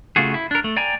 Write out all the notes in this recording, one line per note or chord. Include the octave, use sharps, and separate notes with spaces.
C#3 A3 F4 F#4 G#4
E4
D4 A#4
A3
D5 G5 G#5 A#5